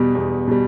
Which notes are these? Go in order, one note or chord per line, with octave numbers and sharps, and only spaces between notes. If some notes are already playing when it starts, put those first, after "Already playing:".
Already playing: E2 B2 G3
E2
B2 G3